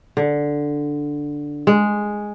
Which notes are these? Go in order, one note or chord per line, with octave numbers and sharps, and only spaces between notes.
D3
G#3